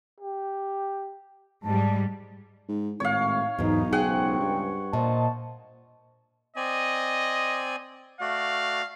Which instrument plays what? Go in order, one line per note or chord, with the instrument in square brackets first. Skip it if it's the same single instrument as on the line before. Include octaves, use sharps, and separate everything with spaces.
[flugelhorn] G4
[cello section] G#2 G3 [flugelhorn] A5
[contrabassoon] G#2
[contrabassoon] G#1 [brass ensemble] A2 [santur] C#5 F5
[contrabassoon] B1 [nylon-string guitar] E2 G#2 [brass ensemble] D#4
[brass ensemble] C#2 C5 G5 [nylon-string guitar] G#4 [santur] F#5
[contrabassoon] G2
[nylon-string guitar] A#2 [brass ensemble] C5 D#5 A5
[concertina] C4 D5 G#5 [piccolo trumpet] D#5
[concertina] A3 F#4 D5 [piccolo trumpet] F5